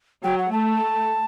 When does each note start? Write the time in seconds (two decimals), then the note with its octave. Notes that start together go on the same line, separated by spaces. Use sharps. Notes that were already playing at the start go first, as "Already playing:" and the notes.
0.24 F#3 G5
0.38 F#5
0.52 A3 A5